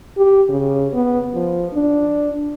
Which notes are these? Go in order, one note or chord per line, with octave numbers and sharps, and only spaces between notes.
G4
C#3
B3
F3
D4